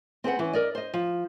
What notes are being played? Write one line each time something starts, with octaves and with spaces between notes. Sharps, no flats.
C4 G#4 B4 F#5
E3 C#4
A#4 D5 D#5
C5 D#5
F3